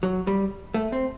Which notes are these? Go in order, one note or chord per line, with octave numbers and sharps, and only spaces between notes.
F#3
G3
A3
C4